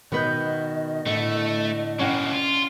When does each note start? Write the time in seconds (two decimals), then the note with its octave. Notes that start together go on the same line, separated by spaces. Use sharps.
0.12 B2 D#3 B3 B4 D#5 G6
1.06 A2 D3 A3
1.99 B2 A#3 C#4 D5 F#5 G5
2.33 F4